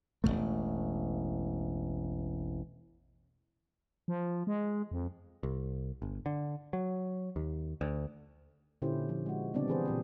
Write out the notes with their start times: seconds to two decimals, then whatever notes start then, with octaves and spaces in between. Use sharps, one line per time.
0.24 E1 A1 A#2 A3
4.08 F3
4.47 G#3
4.91 F2
5.43 C2
6.02 G1
6.26 D3
6.73 F#3
7.36 D#2
7.81 D2
8.82 A#2 D3 C#4 E4 G4 C5
9.09 F3
9.26 G#3 F#4
9.54 C#3 G3 B3 C4 D4 D5
9.68 E3 C4 G#4 B4 C5
9.85 A#2 C4 G4